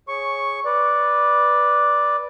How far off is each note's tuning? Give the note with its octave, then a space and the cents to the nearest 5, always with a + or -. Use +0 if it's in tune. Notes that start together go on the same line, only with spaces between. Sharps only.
G#4 +0 C#5 -10 C#6 +0
B4 -10 D5 +0